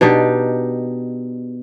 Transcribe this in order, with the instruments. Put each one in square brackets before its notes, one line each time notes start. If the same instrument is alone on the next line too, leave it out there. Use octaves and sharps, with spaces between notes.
[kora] B2 D4 D#4 G4